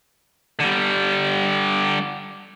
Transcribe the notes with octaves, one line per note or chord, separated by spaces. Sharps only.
D3 G3